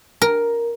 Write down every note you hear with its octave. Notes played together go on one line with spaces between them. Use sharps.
A#4